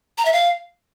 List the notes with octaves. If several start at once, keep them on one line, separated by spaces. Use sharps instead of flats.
A#5
E5
F5